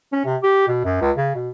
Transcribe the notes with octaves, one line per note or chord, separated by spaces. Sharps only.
C#4
C3
G4
B2
F#2
C#2
C#3
B2